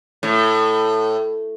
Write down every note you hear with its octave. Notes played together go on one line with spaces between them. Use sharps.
A2